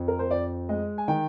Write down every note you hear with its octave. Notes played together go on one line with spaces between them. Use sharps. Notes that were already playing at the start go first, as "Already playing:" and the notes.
Already playing: F2
A#4
C5
F2 D5
G#3 D#5
G#5
D#3 G5